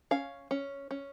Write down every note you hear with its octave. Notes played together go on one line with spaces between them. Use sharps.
C#4 F5
C#4
C#4